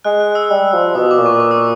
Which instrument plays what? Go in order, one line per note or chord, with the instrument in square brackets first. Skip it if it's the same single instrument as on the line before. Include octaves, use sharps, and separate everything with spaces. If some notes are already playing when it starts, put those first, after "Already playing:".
[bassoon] G#3 [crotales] F#6
[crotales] F#6
E6
[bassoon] G3
F3
[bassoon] B2 [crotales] D#6
[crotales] D6
[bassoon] A#2
[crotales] C#6
D6
E6